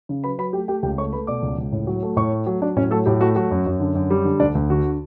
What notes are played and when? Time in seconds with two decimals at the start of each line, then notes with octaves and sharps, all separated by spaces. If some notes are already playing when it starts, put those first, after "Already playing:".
0.09 C#3
0.24 F#3 B4 B5
0.38 F#3 B4 B5
0.53 A3 G4 G5
0.68 A3 G4 G5
0.83 C#2 G4 G5
0.98 A3 C#5 C#6
1.12 A3 B4 B5
1.27 B2 D5 D6
1.43 C#2
1.58 C#2
1.72 A2
1.87 F#3
2.03 A3
2.16 A2 C#5 C#6
2.32 A3
2.46 F#3
2.62 F#3 D4 D5
2.76 A2 C#4 C#5
2.91 F#3 A3 A4
3.06 A2 G4
3.20 A3 F#4
3.36 F#3 F#4
3.51 F#2
3.66 F#2
3.80 D3
3.95 F#2
4.10 G3
4.25 D3
4.40 D2 D4 D5
4.55 D2
4.70 D3 F#4